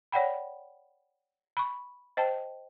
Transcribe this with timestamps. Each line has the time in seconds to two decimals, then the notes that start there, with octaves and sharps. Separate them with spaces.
0.12 C#5 D5 F#5 G5 B5
1.57 B5 C#6
2.17 C5 D#5 G5 A5